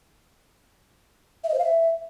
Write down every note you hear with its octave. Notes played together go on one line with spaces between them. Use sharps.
E5
D#5
C5
F5
E5